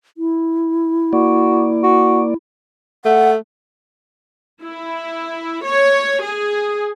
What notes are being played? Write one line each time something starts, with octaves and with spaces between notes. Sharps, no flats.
E4
A#3 F#4 D5
F#4
A3 F#5
E4
C#5
G#4